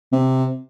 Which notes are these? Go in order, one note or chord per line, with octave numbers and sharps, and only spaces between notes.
C3